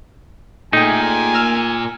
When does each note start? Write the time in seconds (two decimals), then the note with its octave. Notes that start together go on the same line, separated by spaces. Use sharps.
0.73 A#2 A3 D#4 G#4 G5 G#5
1.34 A#4 E6 F6